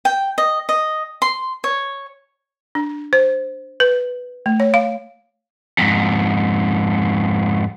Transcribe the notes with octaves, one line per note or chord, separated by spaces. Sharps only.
G5
D#5
D#5
C6
C#5
D4
C5
B4
A3
C#5
F5
F2 G#2